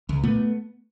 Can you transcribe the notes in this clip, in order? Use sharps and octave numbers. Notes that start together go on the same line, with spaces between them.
C#2
A#2 A3 B3